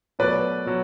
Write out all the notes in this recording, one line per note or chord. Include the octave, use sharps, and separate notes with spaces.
B2 F#3 A3 B4 D5
B2 F#3